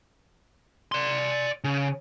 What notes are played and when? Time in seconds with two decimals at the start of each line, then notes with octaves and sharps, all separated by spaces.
0.92 D5 C6
1.64 C#3